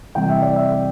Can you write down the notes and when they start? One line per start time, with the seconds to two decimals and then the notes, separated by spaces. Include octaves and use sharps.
0.15 C3 E3 G3 G5
0.29 E5
0.42 D5
0.56 E5